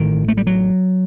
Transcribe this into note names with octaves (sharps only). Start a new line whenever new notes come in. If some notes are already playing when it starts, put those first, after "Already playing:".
Already playing: A1 A2 D#3
A3
G3
F#3